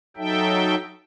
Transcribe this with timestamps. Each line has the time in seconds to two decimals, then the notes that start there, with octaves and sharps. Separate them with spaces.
0.17 F#3 D#4 A4 E5 G5